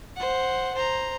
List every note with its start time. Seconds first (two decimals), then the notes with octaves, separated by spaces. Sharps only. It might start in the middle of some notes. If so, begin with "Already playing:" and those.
0.16 C5 F#5
0.74 C5 A#5